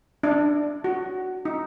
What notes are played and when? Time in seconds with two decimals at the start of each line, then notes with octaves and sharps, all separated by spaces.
0.23 D4
0.84 F#4
1.45 D#4